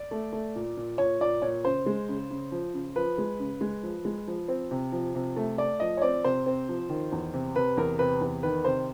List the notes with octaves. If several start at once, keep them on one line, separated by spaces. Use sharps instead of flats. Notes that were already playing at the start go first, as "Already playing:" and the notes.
Already playing: D5
A3
A3
A#2
A#2
A#2 C#5
A#2 D5
A#2 C#5
C#3 C5
G#3
C#3
C#3
F3
C#3
F3 B4
G#3
C#3
G#3
F3
G#3
F3
C4
C3
F3
C3
A3
A3 D5
F3 D#5
C#5
C4 D5
C3 C5
C4
F3
D#3
E2
C3
C3 B4
E2 A#4
C3 B4
E2
D#3 B4
C3 C5